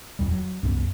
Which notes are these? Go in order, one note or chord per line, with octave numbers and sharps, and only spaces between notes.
D1 B1 F2 G3
F#3
C2 F#2 B3